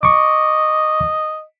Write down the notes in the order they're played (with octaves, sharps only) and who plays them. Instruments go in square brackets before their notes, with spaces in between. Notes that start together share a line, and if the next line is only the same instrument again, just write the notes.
[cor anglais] D#5 [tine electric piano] C#6 D6